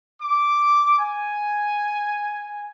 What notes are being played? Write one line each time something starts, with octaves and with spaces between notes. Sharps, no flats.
D6
G#5